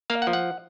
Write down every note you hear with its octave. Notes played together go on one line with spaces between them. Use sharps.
A#3 F5
F#5
F3
F#5